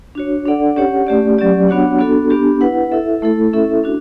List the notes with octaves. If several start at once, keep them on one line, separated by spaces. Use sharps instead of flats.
D4 F#4 C#5
D4 A4 D5 F#5
C#4 G4 C#5 F#5
A3 C#4 G4 D5
F#3 C#4 G4 D5
B3 D4 F#4 C#5 F#5
B3 D4 F#4 A4
B3 D4 G4
E4 B4 F#5
E4 A4 E5
A3 E4 A4
C#4 E4 A4 E5
D4 F#4